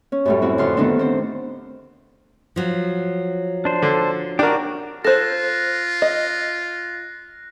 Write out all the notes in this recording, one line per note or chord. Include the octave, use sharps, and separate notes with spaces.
C#4
F#2 A2 G3
C4 E4 F#4
F2 D3 C6 F6
D3 D#3 A3 B3 C4 D4
C4 C5
F3 F#3
D4 C5
D3
D4 F#4 G4 A#4
F4 A4 C5 F#6 A#6
D#5